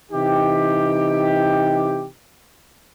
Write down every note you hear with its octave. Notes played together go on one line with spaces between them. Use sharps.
C3 E3 D#4 G4